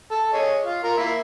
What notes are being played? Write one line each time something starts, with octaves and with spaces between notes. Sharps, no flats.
A4
G#4 C#5 D#5
F4 F5
F4 A#4
A#3 E4